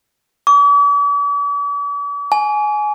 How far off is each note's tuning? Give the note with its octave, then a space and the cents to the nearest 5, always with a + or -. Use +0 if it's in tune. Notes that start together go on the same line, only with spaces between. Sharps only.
D6 -45
G#5 +20